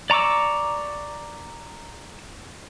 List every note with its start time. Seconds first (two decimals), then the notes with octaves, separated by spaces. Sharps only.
0.10 D5 A#5 C#6 D6 E6